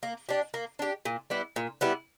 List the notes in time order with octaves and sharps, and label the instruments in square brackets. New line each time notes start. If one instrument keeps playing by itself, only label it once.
[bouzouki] A#3
D4 G4
A#3
D4 G4
A#2
G3 B3 E4
A#2
G3 B3 E4